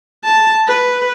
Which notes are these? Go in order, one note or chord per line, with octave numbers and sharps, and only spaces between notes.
A5
B4